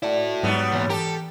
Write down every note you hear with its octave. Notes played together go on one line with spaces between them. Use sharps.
E4 F#4 A4 D5
G#2 F#3 G3 B3
E2 A#2 E3
G4 A4 A#4